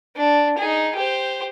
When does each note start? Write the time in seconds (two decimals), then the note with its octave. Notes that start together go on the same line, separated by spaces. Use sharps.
0.16 D4
0.58 D#4 G#4
0.97 G4 C5